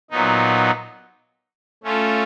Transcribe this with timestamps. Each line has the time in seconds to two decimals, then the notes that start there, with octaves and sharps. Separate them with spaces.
0.10 A#2 F#3 B3 D#4
1.83 A3 C#4 F4 A4